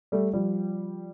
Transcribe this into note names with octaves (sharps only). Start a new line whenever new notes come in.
G3 A3
F3 G3